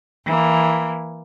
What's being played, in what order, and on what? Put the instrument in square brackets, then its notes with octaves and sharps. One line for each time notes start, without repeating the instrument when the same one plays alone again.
[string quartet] E3 A#3